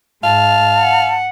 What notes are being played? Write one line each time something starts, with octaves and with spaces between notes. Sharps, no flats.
G#2 F5 A5
F#5